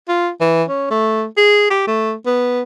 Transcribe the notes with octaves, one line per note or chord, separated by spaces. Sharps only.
F4
E3
C#4
A3
G#4
G4
A3
B3